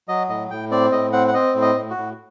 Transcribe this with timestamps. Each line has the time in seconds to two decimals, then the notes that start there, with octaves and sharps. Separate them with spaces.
0.08 F#3 D#5
0.29 A2 D#5
0.50 A2 G5
0.71 C4 D5
0.92 A2 D#5
1.13 C4 F#5
1.28 F#5
1.34 C4 D#5
1.54 A2
1.62 D#5
1.76 A2
1.90 F#4
1.97 A2